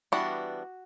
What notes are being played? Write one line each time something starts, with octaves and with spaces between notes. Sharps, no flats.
E3 G3 B3 D4 F#4